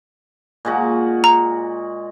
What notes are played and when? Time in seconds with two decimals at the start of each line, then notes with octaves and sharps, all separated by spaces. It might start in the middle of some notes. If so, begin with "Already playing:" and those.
0.65 A#2 G#3 F#4
1.24 A#5